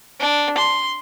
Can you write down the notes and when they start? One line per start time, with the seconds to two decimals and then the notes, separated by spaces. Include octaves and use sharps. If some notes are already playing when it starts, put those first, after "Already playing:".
0.20 D4
0.58 C6